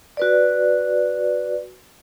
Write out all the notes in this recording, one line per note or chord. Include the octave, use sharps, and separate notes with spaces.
F#4 B4 D5